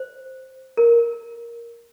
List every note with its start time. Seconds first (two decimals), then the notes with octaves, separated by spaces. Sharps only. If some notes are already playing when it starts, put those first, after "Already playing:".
Already playing: C5
0.77 A#4